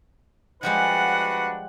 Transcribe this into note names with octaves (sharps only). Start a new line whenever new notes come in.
F3 G3 G#3 D4 F#4 B4 F#5